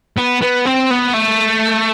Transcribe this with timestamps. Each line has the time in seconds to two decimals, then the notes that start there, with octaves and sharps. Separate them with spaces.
0.18 B3
0.42 B3
0.66 C4
0.91 B3
1.14 A3